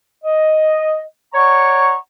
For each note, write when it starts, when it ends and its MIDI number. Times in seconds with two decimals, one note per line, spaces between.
0.24 1.02 75
1.33 1.95 73
1.33 1.95 74
1.33 1.95 78
1.33 1.95 82
1.33 1.95 85